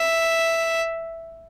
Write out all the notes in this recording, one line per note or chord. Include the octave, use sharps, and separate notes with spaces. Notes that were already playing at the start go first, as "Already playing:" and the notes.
Already playing: E5